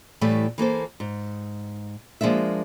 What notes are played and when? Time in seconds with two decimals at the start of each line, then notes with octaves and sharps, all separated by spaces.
0.21 A2 E3 G3 A3
0.58 E3 A#3 A4 C5
1.00 G#2
2.21 F3 G#3 A#3 D4 E5